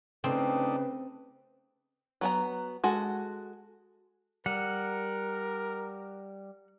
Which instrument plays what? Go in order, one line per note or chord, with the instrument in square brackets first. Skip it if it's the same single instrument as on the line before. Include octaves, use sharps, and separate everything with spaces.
[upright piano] C#3 [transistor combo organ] A3 D4 D#4 [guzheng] C4 [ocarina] B4
[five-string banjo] F#3 B3 A#5
G#3 F#4 A4
[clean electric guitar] G3 [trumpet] A#4 [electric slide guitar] F#5